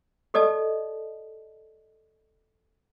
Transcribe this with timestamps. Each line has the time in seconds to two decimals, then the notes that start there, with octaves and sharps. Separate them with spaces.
0.34 G4 A4 D5 D#5 A5